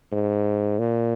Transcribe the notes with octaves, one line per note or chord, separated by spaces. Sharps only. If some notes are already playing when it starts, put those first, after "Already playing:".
G#2
A#2